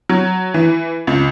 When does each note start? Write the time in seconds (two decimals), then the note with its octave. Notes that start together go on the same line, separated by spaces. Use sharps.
0.09 F#3
0.54 E3
1.07 C#2